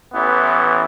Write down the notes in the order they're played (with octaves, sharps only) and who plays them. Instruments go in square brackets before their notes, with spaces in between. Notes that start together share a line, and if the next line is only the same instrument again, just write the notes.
[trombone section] A1 E3 B3